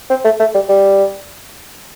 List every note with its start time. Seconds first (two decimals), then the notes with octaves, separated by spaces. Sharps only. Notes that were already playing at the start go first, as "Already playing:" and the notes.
0.10 C4
0.24 A3
0.40 A3
0.54 G3
0.69 G3